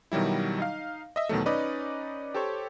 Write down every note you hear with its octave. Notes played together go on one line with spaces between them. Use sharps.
B2 D#3 F#3 G3 E4
D#4 F5
D#5 E5
E2 B2 D#3 F#3 A3
C#4 D#4 B4 D5 D#5
G4 A4 C5 C#5